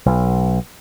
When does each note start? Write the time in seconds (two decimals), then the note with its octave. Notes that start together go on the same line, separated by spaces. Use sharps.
0.06 B1